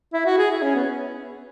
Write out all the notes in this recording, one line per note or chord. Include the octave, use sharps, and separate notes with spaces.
E4
F#4
G#4
E4
C#4
B3